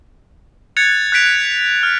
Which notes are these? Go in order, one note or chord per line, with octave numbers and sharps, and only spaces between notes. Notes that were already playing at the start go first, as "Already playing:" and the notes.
F#6 G#6 A6 C#7 F7
F#6 G6 B6 D7 F7
F6